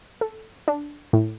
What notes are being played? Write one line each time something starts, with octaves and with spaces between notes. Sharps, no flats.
A4
D4
A2